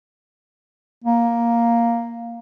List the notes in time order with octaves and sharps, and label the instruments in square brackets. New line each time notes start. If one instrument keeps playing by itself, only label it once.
[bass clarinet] A#3